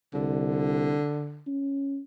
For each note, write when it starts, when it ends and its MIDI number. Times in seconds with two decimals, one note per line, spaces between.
0.14 0.99 36
0.14 1.44 50
1.47 2.00 61